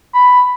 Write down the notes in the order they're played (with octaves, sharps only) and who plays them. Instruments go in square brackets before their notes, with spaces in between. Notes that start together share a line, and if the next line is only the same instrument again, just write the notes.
[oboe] B5